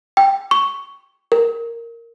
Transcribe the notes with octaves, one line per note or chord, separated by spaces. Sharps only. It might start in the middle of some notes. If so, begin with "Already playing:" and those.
G5
C#6
A#4